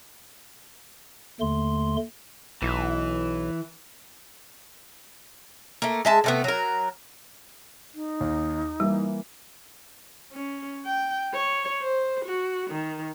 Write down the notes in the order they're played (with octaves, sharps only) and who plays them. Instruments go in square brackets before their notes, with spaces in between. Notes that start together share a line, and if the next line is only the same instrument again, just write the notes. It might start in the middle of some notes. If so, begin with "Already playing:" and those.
[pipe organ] D#2 D3 A3 C6
[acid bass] B1 [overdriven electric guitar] E3
[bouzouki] A3 A#3
G#3 E5 A5
C3 A3 B3
F#3 A#4
[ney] D#4
[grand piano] D#2
[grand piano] E3 A#3 [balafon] G3
[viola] C#4
G5
C#5
C5
F#4
D#3